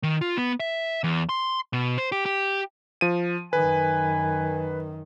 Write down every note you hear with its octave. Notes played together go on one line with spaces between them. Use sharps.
D#3
F4
B3
E5
E2
C6
B2
C5
G4
G4
F3 D#7
F#2 D#3 B4 G#5